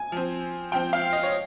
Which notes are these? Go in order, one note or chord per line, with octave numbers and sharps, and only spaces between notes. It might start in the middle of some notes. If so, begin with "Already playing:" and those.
Already playing: G#5
F3 C4
F3 C4 G5
F5
D#5
C#5